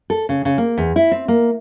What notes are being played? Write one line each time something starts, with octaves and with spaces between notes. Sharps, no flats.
A4
C#3
C#3
A#3
E2
E4
C4
A#3